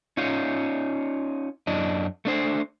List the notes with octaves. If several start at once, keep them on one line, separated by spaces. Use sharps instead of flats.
C#4 D#4 F4
F#2 D4 D#5
A3 D4 C5